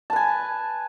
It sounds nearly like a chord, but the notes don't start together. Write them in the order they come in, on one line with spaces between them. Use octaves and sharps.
A5 B4 G#5